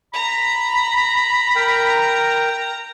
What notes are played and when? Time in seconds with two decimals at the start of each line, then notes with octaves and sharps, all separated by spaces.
0.14 A#5 B5
1.56 A#4 G5